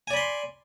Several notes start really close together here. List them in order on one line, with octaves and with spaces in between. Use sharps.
G#5 D5 B5 C6